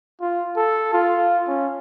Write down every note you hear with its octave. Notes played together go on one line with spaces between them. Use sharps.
F4
A4
F4
C#4